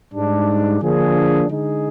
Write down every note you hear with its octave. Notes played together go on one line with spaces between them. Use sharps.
G#2 G3 D4
D3 F3 A#3 D4 G#4
D3 G#3 D#4 G#4